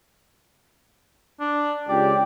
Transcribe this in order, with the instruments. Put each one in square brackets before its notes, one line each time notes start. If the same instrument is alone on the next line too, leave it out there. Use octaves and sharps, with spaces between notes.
[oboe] D4
[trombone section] C#2 G4 [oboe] D5